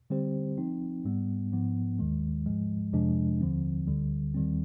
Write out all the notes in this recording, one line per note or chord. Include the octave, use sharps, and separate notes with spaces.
D3 G3 C4 G4 C5
F3 C4 D#4
G#2 G3 B3
G#2 F3 B3
D#2 D#3 G#3
G#2 F3 G#3
F2 C3 F3 G#3 D4
D#2 D3 F3 C4
D2 D3 G3
D#2 D#3 G3 C4